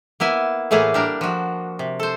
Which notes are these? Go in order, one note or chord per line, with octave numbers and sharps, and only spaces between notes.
A#3 B3 E4 G#5
A2 E3 A3 A#3 G#4
G3 D4 A#4
F3 F#4
C3
A4 C5